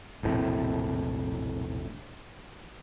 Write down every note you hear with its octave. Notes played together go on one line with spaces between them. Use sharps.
E1 A#1 A2 C3